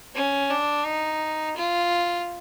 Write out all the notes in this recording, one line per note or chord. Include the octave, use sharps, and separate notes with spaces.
C#4
D4
D#4
F4